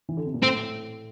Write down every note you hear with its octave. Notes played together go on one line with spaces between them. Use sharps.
E3
D3
C3
A#2
A2 C4